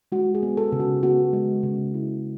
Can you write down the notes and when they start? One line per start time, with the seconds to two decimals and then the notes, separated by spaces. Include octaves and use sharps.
0.12 G#3 F#4
0.35 G#4
0.43 B3
0.57 A4
0.72 C#3
0.80 F#4
1.03 B3 F#4
1.33 G#3
1.63 C#3
1.94 E4